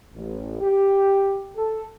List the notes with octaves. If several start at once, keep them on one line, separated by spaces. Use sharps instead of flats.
A1
G4
A4